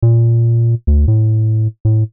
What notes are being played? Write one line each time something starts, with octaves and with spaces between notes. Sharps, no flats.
A#2
D2
A2
A2